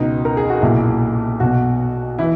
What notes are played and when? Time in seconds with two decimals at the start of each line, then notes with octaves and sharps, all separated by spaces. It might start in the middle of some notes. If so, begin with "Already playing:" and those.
Already playing: C#2 B2 D#4
0.25 A#4
0.37 G#4
0.50 F#4
0.61 B1 A#2 E4
1.40 B1 B2 F#4
2.19 E3 E4